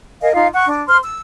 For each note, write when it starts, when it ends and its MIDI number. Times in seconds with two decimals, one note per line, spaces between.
0.21 0.32 70
0.21 0.32 75
0.21 0.32 77
0.21 0.32 80
0.34 0.47 63
0.34 0.47 65
0.34 0.47 77
0.53 0.64 78
0.53 0.64 85
0.66 0.83 62
0.87 0.97 72
0.87 0.97 84
0.87 0.97 89
1.03 1.20 88